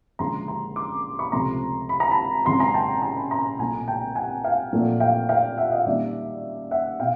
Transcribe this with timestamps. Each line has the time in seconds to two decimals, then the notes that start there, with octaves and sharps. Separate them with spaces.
0.19 F#1 F#2 D3 F3 G#3 A#5 C6
0.48 A#5 C6
0.76 C6 D6
1.19 B5 C#6
1.32 C#2 C3 F3 A3 A#5 C6
1.89 B5
2.00 A#5
2.11 A5 B5
2.45 G#1 F#2 C#3 F#3 A#5 C6
2.60 G#5 A#5
2.74 G5 A5
3.02 G#5 A#5
3.17 A5 B5
3.31 A#5 C6
3.59 B1 A#2 F#3 A3 G#5 A#5
3.88 G5 A5
4.16 F#5 G#5
4.44 F5 G5
4.73 A#1 A#2 F#3 A3
5.00 F5 G5
5.29 F5 G5
5.58 E5 F#5
5.71 D#5 F5
5.86 F#2 D#3 G3 A#3 D5 E5
6.71 E5 F#5
7.00 B2 F5 G5